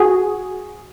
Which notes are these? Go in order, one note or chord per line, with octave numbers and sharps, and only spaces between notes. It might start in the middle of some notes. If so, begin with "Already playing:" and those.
Already playing: F#4 G#4